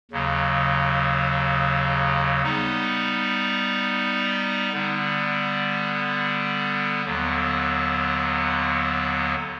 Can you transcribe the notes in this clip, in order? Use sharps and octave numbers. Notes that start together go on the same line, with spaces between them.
D#2 C#3 F#3
G3 B3 D#4
D3 G3 B3
D#2 D3 F#3 B3